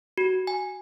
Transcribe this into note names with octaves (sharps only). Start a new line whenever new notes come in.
F#4
G#5